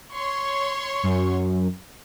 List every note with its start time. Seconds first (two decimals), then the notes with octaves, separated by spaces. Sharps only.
0.13 C#5 C6 C#6
1.03 F#2